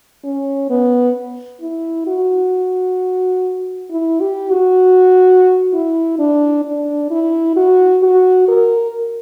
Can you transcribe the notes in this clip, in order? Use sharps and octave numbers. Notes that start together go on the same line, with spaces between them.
C#4
B3
E4
F#4
E4
G4
F#4
E4
D4
D4
E4
F#4
F#4
A#4